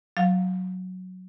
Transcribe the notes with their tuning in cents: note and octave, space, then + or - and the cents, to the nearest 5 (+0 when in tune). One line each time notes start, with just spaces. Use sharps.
F#3 +0 F5 +5